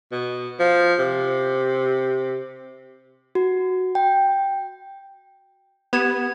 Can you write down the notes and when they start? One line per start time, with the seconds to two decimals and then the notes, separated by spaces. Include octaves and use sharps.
0.12 B2
0.60 F3
0.99 C3
3.35 F#4
3.95 G5
5.93 B3 G4 G#6 E7